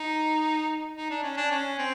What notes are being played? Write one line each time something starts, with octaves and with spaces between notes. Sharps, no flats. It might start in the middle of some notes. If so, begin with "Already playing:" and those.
Already playing: D#4
D#4
D4
C#4
D4
C#4
C4